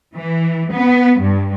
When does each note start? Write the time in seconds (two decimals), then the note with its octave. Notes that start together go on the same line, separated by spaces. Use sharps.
0.16 E3
0.72 B3
1.19 G2